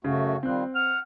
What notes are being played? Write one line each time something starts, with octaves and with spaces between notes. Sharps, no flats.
F#2 C#3 A3 F#4
D#3 G3 C4 F4 F#6
F#5 F6